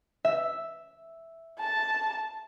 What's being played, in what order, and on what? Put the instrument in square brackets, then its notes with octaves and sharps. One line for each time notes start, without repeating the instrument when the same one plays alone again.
[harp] E5
[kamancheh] A5